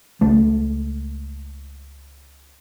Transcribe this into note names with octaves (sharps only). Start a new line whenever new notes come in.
C#2 A3